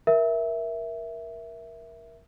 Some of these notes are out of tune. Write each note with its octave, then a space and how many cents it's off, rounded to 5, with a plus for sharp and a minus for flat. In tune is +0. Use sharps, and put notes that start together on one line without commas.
A#4 +20 E5 +0